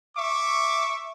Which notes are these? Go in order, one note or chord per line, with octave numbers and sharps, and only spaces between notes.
E5 C#6 D6